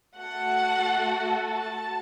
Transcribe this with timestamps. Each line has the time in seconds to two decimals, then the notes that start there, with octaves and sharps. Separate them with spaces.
0.17 A3 F#4 A4 F#5
1.46 A5